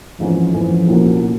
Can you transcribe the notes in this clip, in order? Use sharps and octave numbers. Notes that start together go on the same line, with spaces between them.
G#1 G#2 E3 F3 A3 C#4
G#1 G#2 E3 F3 A3 C#4
C2 A#2 F#3 A#3 C#4
A#2 F#3